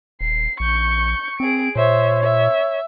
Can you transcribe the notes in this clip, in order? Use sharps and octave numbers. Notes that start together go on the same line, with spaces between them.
D#1 C7
A#1 C#6 G6
C4 G#4 D7
A#2 C5 C#5 E5
E5